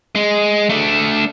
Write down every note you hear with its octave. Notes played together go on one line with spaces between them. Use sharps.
G#3
A3 D4